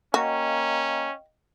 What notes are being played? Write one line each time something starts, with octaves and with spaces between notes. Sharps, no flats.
A#3 C#4 F#4 D#5 F5 G5